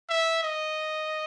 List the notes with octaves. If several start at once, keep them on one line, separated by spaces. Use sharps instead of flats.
E5
D#5